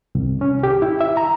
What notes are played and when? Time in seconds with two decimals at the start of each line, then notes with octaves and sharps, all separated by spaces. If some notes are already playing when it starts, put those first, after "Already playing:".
0.15 C2
0.41 C#4
0.63 G4
0.82 E4
1.01 E5
1.17 A#5